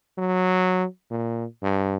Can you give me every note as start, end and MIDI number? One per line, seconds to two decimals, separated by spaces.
0.18 0.85 54
1.11 1.45 46
1.63 1.97 43